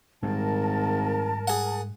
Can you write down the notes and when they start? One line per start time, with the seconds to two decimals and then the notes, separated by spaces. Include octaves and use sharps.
0.23 G#1 G#2 G3 A#4 A5
1.48 G#4 F#5